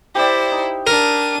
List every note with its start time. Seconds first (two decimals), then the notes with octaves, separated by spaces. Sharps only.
0.15 E4 G4 C5 D5
0.51 D#4
0.87 D4 A#4 D#7